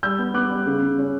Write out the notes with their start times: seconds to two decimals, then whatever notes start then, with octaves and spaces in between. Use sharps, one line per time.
0.03 G3 E6 G6
0.19 B3
0.34 B3 D6 F#6
0.50 G3
0.66 C#3
0.82 C#3
0.98 C#4